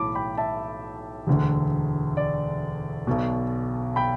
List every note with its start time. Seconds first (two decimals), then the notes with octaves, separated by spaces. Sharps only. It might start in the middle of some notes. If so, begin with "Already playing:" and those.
Already playing: B1 A2 E3 A5 B5 D6
0.15 G5 B5
0.38 E5 A5
1.27 E1 D2 D3
2.17 D5
3.07 B1 B2
3.96 G5 B5